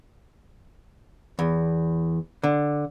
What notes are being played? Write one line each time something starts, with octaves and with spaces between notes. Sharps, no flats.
E2
D3